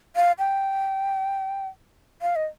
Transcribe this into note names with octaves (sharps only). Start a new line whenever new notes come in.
F5
G5
F5
D#5